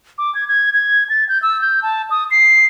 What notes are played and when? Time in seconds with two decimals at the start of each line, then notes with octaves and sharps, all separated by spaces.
0.18 D6
0.35 G#6
0.48 G#6
0.74 G#6
1.10 A6
1.29 G6
1.42 E6
1.61 G6
1.83 A5
2.11 D#6
2.31 C7